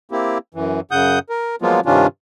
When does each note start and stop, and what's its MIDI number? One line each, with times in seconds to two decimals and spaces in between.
0.12 0.38 58
0.12 0.38 60
0.12 0.38 64
0.12 0.38 67
0.54 0.80 42
0.54 0.80 52
0.91 1.19 42
0.91 1.19 49
0.91 1.19 78
0.91 1.19 87
0.91 1.19 91
1.30 1.56 70
1.62 1.80 53
1.62 1.80 54
1.62 1.80 56
1.62 1.80 58
1.62 1.80 59
1.62 1.80 65
1.86 2.07 43
1.86 2.07 48
1.86 2.07 51
1.86 2.07 61
1.86 2.07 62
1.86 2.07 65